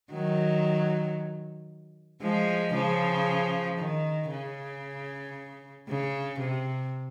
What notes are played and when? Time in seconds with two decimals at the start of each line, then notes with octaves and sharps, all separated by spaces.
0.13 D#3 F#3
2.22 F3 G#3
2.74 C#3 F3
3.78 D#3
4.31 C#3
5.88 C#3
6.40 C3